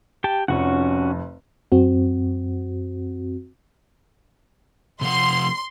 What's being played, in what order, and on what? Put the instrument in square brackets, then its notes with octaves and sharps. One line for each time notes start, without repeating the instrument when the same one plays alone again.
[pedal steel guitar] G4 G5 A5
[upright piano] F1 F2 [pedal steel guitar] C#4 F#4 F#5
[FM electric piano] F#2 C4 F#4
[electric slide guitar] C3 F3 F#5 [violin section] C6